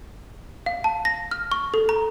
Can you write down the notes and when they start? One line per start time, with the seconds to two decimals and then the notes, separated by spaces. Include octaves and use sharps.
0.66 F5
0.84 A5
1.05 A#6
1.31 F6
1.52 C#6
1.74 A4
1.89 A#5